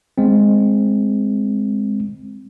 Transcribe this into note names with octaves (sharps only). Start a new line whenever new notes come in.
G#3 C4